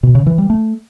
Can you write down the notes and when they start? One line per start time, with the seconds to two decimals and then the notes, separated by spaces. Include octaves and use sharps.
0.03 B2
0.15 C#3
0.27 E3
0.38 G3
0.50 A3